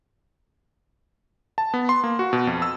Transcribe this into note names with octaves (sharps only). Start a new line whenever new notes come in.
A5
B3
C6
A#3
F#4
B2
F2
E6